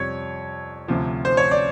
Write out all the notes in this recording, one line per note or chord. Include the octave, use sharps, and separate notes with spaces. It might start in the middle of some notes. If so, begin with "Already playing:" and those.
Already playing: F2 C3 G3 C#5
D2 C3 F3
C5
C#5
D5